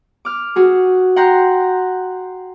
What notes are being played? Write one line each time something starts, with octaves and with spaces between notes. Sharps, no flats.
D6 F6
F#4 G#4
F#5 G5 A#5 C6 F#6